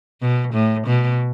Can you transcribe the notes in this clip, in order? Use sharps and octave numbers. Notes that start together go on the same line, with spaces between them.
B2
A2
B2